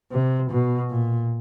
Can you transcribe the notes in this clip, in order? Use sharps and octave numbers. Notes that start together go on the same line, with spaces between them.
C3
B2
A#2